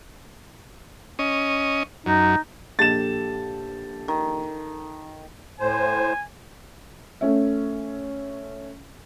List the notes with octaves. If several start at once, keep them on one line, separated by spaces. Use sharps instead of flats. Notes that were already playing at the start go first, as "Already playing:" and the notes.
C#4 D#5
F#2 D#4
A#1 G4 A4 A6 E7
D#3
A2 C5 G#5
A3 C#4 E5